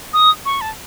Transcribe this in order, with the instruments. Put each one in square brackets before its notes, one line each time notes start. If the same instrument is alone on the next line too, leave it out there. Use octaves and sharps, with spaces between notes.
[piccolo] D#6
C#6
A5